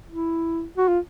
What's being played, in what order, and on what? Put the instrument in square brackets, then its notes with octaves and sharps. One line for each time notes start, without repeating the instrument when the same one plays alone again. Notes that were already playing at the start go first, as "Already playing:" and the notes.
[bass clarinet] E4
F#4
F4